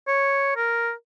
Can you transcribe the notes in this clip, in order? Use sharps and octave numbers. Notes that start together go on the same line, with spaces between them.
C#5
A#4